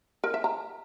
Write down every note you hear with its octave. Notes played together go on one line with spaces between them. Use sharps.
A#4
E5
A#5